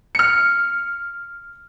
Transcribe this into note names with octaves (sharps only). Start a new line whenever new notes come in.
F6 C#7